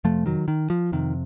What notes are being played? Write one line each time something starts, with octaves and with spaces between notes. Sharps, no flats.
F2 C3 F3 A3
D#3 F#3
D#3
F3
F2 C3 D#3